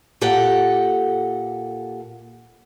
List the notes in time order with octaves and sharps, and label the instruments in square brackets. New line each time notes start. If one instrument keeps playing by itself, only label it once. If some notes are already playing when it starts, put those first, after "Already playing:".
[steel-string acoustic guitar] A#2 G4 A4 F#5